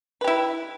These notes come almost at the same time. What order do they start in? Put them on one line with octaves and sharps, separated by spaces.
B4 G4 E4